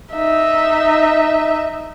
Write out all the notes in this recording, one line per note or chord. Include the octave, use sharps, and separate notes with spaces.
D#4 E5